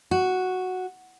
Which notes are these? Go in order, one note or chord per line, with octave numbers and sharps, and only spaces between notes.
F#4